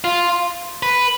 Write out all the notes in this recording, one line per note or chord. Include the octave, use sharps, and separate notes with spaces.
F4
B4